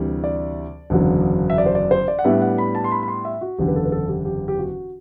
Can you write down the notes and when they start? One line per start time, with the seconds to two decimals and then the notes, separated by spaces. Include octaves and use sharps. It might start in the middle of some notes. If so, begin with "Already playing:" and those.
Already playing: D2 C3 E3 G3
0.24 D5
0.90 F#1 E2 D3 F#3
1.50 E5
1.58 D5
1.66 C5
1.75 D5
1.91 C5
2.08 D5
2.19 F#5
2.24 A2 G3 B3 D4 E5
2.42 F#5
2.58 B5
2.75 A5
2.84 C6
2.92 B5
3.03 B5
3.08 C6
3.25 E5
3.41 F#4
3.58 F#1 E2 D3 G4
3.68 B4
3.76 A4
3.86 B4
3.92 A4
4.09 G4
4.25 G4
4.48 G4
4.59 F#4